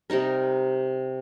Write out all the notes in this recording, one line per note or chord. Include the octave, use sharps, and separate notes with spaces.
C3 G3 D#4 A#4